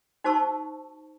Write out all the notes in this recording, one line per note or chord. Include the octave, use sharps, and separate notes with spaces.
D#4 F#4 C5 A5 C#6 E6